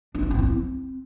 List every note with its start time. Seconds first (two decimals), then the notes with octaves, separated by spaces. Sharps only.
0.15 D4
0.23 C#4
0.31 C4
0.39 E4
0.47 C4